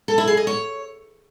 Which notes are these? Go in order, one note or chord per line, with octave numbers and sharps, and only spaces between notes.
A4
E4
G#4
D#5
C#5